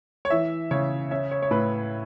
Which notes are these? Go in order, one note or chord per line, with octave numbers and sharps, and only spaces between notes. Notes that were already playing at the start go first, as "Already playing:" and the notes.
C#5
E3 E5
C#3 C#5
C#4 E5
C#5
C#5
A2 B4